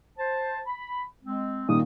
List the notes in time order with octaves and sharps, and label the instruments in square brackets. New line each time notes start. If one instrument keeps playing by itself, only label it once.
[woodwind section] C5 A5
B5
G#3 C4
[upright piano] A#2 D#3 [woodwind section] A#3 G4 D#6